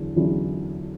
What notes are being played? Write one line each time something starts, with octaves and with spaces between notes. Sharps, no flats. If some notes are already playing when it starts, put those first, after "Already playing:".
Already playing: E2 D3 F#3
E2 D3 F#3 C#4 E4